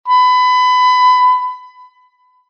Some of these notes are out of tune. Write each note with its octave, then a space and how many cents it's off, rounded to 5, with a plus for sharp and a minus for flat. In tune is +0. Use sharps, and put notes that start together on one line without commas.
B5 +25